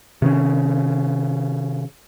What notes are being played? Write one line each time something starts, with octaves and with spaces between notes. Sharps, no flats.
C3 D#3 C#4